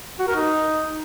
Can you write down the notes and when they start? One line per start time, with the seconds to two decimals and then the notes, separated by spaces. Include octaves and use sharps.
0.19 F#4
0.27 A#4
0.35 D#4